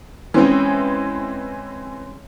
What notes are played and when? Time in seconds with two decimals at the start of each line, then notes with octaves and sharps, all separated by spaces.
0.34 E3 G#3 C4 C#4